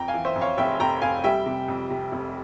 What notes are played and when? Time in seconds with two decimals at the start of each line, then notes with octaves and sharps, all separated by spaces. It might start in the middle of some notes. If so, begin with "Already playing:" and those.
Already playing: F2 G5 A#5
0.08 F5 G#5
0.14 E3
0.25 C5 E5
0.36 F2
0.41 C#5 F5
0.58 F1 E5 G5
0.80 F1 G5 A#5
1.02 F1 F5 G#5
1.24 G3 E5 G5
1.46 C3
1.68 F2
1.90 C3
2.12 F1